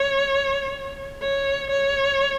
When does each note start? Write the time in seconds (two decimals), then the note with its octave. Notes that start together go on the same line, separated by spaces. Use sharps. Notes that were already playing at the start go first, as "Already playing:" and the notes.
Already playing: C#5
1.22 C#5
1.70 C#5